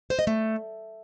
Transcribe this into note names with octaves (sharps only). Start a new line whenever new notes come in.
C5
D#5
A3